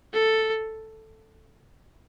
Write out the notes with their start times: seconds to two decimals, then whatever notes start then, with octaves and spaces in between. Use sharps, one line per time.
0.14 A4